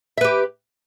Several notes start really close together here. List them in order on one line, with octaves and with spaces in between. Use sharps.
E5 B4 G4